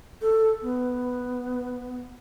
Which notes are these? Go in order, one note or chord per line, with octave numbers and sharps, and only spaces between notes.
A4
B3